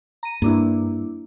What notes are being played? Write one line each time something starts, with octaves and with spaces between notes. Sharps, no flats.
A#5 D#7
G2 A#3 D4 E4